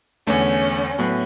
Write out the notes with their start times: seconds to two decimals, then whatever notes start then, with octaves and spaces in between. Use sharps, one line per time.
0.27 E2 D3 A3 C#4
0.99 A2 F#3 B3